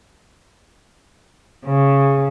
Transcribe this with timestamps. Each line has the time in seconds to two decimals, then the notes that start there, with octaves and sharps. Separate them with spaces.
1.66 C#3